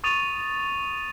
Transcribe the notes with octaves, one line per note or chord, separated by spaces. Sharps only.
C#6 D#6 A6 D#7 F7